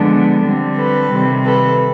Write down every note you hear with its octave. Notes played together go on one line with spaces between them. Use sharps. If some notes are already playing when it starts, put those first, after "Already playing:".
Already playing: D3 F3 G#3 B3 D4
D3 G3 C4
A4 B4
C3 D#3 G3 C4
A4 B4